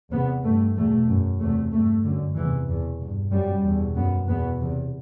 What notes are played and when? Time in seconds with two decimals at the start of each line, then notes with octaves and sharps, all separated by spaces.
0.12 E2 C3 B3
0.44 G2 A3
0.76 E2 B2 A3
1.08 F#2
1.40 E2 C3 A3
1.72 G2 A3
2.04 F#2 D3
2.36 E2 C3 E3
2.68 E2 B2
3.00 G2
3.31 F#2 G3
3.64 E2 B2
3.95 F#2 B3
4.27 E2 B2 B3
4.60 E2 C3